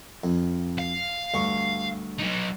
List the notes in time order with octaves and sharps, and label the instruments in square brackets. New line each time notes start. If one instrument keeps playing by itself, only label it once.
[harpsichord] F2
[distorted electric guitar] F5
[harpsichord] D2 G2 C#6
[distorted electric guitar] F#3 D#4